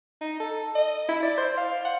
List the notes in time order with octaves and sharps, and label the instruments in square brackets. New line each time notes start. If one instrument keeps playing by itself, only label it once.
[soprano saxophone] D#4
A4
D#5
E4
D5
C5
F5
F#5